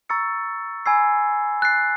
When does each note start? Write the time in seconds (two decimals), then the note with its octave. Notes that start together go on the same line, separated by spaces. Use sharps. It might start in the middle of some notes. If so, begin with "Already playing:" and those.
0.09 A#5 C#6 E6 A6 C#7
0.86 G#5 B5 E6 G#6 C7
1.62 F#6 A6 C7